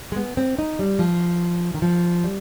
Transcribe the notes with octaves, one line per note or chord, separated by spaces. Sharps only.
G#3
B3
C4
D#4
G3
F3
D#3
F3
G3